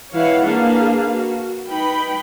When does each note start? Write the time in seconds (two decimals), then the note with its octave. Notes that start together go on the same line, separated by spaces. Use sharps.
0.14 E3 E4 B4 C#5 F5 F#5
0.46 A#3 D4 G#4 B4 F5
1.12 F#4
1.68 D#4 B4 G5 B5